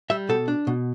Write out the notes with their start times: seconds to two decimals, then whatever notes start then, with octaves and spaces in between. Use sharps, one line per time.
0.10 G3 E5
0.29 B2 A4
0.48 D4
0.67 B2